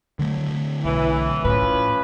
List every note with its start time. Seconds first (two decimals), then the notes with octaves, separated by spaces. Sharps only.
0.19 D3 F#3 A3
0.84 B1 E3
1.45 A2 F3 C#4 B4